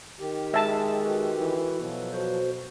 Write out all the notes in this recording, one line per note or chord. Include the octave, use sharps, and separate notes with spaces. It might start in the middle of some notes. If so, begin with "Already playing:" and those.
D#3 G4
G#3 E5 A5
F#4 A4 B4
E3
B2 F3 F#3
F#4 C5